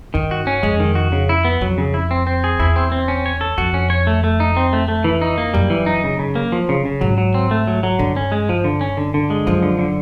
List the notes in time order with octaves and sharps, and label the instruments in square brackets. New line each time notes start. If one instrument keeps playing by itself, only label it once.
[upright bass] G2 [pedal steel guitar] D#3
[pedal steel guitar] F#4
C#4
[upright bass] F2 [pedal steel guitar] G#3
[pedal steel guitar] D#3
F#4
C#3
E4
B3
[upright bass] F2 [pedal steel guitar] F#3
[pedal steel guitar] C#3
E4
C4
C4
G#4
[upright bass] E2 [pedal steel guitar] E4
[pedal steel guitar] C4
C4
C#4
C#5
A4
[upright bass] F2 [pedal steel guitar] F#4
[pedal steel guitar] C#4
C#5
A3
A3
D#4
C4
A3
A3
E3
D#4
A#3
[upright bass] F#2 [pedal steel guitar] G3
[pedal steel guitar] E3
D#4
C#3
C#3
A#3
F3
C#3
C#3
[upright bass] G#2 [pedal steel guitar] F#3
[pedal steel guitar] F#3
C4
A3
F#3
F#3
[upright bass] G2 [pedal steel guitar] D3
[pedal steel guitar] C#4
G#3
F3
D3
C#4
D3
D3
G#3
[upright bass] F#2 [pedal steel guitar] F3
[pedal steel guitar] D3
D3